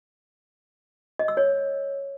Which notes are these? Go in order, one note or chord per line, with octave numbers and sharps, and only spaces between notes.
D#5
E6
C#5